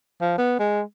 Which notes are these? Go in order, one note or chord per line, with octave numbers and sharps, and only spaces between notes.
F3
B3
G#3